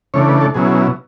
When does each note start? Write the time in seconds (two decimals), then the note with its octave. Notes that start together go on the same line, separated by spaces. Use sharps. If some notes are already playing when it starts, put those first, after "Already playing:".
0.14 C#3 E3 A3 D4 C#5
0.28 B4
0.41 A4
0.54 B2 F#3 C#4 E4 G#4